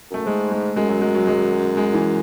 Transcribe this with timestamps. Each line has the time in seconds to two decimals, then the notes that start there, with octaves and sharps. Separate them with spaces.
0.10 F#2 A3
0.26 G#2 G#3
0.51 G#3
0.76 F#2 G#3
0.89 F#3
1.02 G#3
1.15 F#3
1.27 G#3
1.77 G#3
1.94 E3